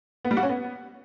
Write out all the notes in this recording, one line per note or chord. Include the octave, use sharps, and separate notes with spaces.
B3
G3
F#4
C#4
B3